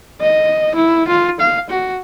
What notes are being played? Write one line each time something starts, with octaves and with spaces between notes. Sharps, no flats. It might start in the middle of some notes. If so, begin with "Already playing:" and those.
D#5
E4
F4
F5
F#4